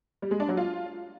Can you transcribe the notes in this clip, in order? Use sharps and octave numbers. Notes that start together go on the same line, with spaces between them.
G3
G#3
D4
F#3
F4